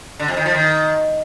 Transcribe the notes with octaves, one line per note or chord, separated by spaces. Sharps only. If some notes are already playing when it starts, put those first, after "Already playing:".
D3
F2
D#3
F3
D#3